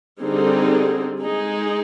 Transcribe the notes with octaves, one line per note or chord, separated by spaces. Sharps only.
D3 G3 C4 D#4 G#4
G#3 D#4 G#4